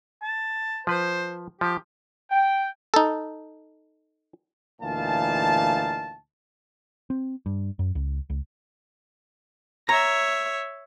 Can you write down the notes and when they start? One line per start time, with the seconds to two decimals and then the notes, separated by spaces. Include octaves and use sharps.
0.22 A5
0.87 F3 B4 C5
1.61 F3 G4
2.31 G5
2.94 D#4 A4
4.81 D2 A#2 E3 D#4 F5 A5
7.10 C4
7.46 G2
7.79 F#2
7.95 C#2
8.30 C#2
9.89 C#5 E5 A#5